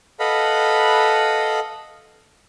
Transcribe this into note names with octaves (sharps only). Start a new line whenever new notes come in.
A4 B4 D#5 F5 F#5 B5